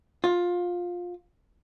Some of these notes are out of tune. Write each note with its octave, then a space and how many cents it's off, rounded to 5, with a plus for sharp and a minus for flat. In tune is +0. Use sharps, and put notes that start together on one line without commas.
F4 +15